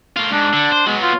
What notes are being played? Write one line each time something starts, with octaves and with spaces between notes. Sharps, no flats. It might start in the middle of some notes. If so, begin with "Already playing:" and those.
A2 F4
G#2 D4
D3
C5
F#3 G#3 B3
F4